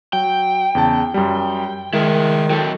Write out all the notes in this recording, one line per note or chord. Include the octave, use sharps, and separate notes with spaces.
F#3 G5
E2 C#3 A5
F#2 G3
D#3 G#3 E4 A#4
F#3 A4 G5